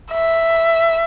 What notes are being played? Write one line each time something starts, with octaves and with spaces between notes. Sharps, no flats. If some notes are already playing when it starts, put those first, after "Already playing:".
E5